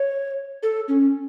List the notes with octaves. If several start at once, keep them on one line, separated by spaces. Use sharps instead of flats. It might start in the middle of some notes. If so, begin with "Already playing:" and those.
Already playing: C#5
A4
C#4